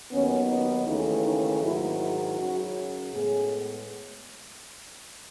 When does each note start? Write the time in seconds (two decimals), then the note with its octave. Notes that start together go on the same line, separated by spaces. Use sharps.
0.11 D#2 D#3 F#3 B3 C#4
0.49 D#4
0.86 D#2 C#3 E3 A3 D#4
1.24 D#4
1.62 G#2 D#3 F#3 E4
2.00 E4
2.38 F#2 C#3 F#3 F#4
3.13 A2 G#3 B3 G#4